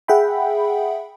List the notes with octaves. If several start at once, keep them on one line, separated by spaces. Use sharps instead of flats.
G#4 E5 F#5 G5 B5